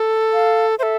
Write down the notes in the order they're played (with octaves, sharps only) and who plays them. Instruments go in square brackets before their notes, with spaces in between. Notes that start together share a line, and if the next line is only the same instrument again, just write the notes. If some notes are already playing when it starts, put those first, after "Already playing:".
Already playing: [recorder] A4
[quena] F5
[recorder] A4 C5 [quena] E5